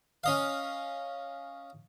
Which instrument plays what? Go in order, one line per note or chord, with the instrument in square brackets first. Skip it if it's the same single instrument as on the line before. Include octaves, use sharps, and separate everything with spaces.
[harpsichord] C#4 D#5 F5